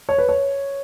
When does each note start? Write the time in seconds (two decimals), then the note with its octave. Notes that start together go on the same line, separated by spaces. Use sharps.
0.09 C#5
0.18 B4
0.29 C#5